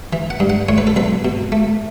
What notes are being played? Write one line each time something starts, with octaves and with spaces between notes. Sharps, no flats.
E3
F#5
G2
F#5
A2 C#5
B4
A4
B1 B4
B2
A3